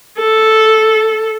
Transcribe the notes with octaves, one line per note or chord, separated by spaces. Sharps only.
A4